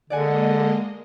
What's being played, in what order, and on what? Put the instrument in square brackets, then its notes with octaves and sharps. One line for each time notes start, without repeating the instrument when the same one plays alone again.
[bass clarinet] D3 [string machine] G#3 A#3 D#5 [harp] D5 F#5 G#5